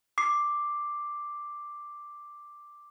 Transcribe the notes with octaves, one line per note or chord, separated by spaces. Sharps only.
D6 C7